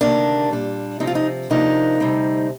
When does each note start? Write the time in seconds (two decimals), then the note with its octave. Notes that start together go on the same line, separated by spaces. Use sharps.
0.01 D2 C3 D#3 A#3 D4
0.51 A#2 G3 D4
1.00 C3 F3 C4 D#4
1.07 F4
1.15 D#4
1.50 C3 F3 A#3 D4 D#4
2.00 D2 C3 G3 C4